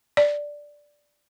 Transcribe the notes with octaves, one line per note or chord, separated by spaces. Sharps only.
D5